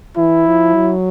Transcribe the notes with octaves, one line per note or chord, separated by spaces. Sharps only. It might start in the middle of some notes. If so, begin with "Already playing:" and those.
E3 E4
F3
F#3